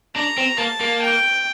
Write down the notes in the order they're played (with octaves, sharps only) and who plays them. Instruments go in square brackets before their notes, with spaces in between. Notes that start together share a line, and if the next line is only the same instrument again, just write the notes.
[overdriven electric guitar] D4 [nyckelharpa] A#5
[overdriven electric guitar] C4
[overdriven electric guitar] A#3 [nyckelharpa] A5
[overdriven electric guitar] A#3
[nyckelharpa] G5